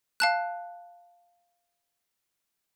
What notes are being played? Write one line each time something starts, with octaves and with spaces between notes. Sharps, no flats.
F5 A5 F#6